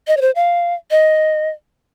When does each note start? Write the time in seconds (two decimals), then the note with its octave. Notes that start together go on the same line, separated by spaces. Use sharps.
0.07 D#5
0.17 C#5
0.21 C5
0.35 F5
0.91 D#5